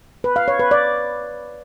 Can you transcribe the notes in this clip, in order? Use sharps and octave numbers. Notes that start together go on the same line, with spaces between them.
B4
F5
C#5
B4
D5